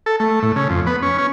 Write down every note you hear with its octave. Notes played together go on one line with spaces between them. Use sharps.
A4
A3
A2
C#3
F2
B3
C#4
C#4